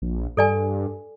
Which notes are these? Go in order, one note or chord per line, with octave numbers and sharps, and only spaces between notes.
A#1
G2 A4 D5 G#5